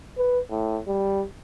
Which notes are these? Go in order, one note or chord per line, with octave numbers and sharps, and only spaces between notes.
B4
A2
G3